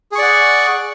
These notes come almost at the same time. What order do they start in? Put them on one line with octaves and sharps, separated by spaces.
G#4 C#6 D5 F#5